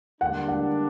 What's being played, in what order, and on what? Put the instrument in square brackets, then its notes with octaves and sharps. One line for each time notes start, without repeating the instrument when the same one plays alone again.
[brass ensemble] D3 G3 A#3 D4 [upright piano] F#5
[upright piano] F#5